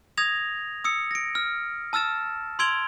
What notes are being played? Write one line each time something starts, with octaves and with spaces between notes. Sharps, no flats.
D#6 G#6 A#6 F7
D#6 E6 C#7
A#6 D7
F6
A5 E6 F6 A6 E7
C6 E6 G#6 D7 F7 G7